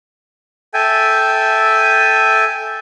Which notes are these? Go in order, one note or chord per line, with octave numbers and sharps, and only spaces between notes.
A4 E5 G5 G#5